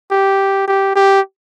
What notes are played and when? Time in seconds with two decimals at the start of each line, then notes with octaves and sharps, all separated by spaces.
0.11 G4
0.68 G4
0.96 G4